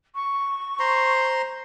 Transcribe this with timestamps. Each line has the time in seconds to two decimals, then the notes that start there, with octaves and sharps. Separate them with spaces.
0.15 C#6
0.79 C5 A#5 C6